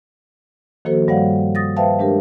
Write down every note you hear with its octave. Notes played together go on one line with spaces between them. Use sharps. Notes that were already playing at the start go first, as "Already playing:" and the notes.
D#3 F3 A#3 F#4 A4 C5
G2 G3 C#5 D5 F5 F#5
D#6 A6 A#6
B4 C5 E5 F5 G5 A5
G#3 D4 G4 A#4